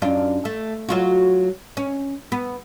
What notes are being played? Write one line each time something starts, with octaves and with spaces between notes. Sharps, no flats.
F#2 D4 F4
A3
F#3 F4 F#4
C#4
B3